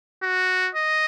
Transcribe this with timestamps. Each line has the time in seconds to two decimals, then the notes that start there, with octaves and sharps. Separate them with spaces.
0.23 F#4
0.75 D#5